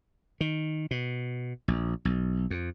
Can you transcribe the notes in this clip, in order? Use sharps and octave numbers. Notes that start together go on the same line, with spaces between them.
D#3
B2
A#1
B1
F2